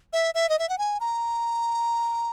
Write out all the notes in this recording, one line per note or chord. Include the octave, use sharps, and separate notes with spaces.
E5
E5
D#5
E5
F#5
G#5
A#5